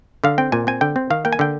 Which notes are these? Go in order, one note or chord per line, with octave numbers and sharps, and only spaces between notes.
D3 F5
C4 G5
A#2 G#5
C4 G#5
D3 G5
C4
D#3 F5
A#3 G5
G#5
D3 G5